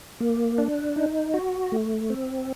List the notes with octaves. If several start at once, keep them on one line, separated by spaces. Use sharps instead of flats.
A#3
D4
D#4
F#4
A3
C4